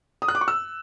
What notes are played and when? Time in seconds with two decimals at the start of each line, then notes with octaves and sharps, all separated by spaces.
0.22 D#6
0.28 F#6
0.35 D6
0.41 C#6
0.48 E6